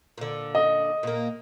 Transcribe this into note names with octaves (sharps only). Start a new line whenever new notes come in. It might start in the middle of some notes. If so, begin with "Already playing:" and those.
A#2 D3
D#5
A#2 A#3